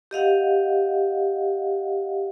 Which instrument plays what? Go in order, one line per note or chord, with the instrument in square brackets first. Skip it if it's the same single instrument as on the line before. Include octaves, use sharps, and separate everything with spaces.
[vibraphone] G4 D#5 F5 F#5